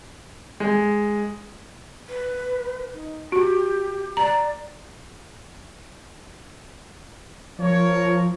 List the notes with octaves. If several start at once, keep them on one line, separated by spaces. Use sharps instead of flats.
G#3
B4
D#4
F#4 G4
D5 A#5
F3 A#4 C#5